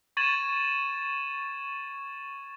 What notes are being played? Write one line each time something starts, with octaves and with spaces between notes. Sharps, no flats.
C#6 G#6 A6 D#7 E7 F#7